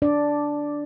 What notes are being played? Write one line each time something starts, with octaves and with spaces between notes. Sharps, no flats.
D4 D5